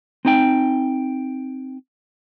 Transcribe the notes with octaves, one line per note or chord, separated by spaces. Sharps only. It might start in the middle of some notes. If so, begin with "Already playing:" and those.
C4 D#4 G5